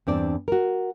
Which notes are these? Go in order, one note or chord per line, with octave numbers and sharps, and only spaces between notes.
E2 G2 C4 D4 D5
F#4 A#4